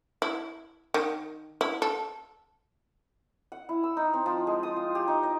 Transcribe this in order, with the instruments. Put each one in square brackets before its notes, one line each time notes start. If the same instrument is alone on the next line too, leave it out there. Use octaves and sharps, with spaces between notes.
[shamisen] E4
D#3
E4
A4
[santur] F#5
E4
E6
D#4
C4
F3
G#3
D#6
F4
G4
D#4
D#5